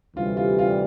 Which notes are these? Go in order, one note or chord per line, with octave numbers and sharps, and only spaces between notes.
D2 C3 E3 G3 F4
F4
F4